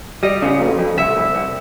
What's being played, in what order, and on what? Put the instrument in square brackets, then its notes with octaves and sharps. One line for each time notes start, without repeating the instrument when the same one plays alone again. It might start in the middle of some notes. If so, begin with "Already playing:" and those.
[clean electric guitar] G3 [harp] D#5
[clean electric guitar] C#3
F2
F2
[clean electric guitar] C2 [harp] E5
[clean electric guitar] C2
C2